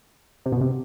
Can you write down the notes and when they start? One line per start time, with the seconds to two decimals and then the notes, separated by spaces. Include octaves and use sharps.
0.46 C3
0.52 B2
0.61 C3